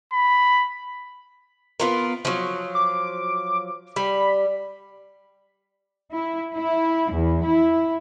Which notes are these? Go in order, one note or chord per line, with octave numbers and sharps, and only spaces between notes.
B5
B3 F4 A#4
F3 F#3
D6
G3 B5
E4
E4
E2
E4